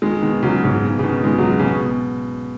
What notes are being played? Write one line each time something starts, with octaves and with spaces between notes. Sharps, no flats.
D#3 G#3
B2 D#3
C#3 F#3
G#2 C#3
B2
C#3
B2 D#3
D#3 G#3
C#3 F#3
C#3
B2
B2